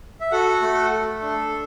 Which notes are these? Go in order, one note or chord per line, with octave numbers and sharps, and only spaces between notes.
E5
F#4 A4 F#5
A3
A4
D4